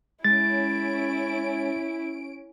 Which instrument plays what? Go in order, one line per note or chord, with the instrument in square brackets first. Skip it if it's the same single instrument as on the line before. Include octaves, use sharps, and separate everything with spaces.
[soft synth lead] G#3 [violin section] C#4 D7 [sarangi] E4 [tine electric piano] A6